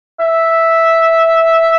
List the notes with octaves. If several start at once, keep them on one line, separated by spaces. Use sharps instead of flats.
E5